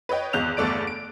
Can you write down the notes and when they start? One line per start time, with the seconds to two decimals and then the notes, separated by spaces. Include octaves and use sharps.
0.09 B4 C#5 D#5 G5
0.33 G#1 E2 F#6 G6 F7
0.57 G1 E2 A3 A4 D5 D7
0.87 D7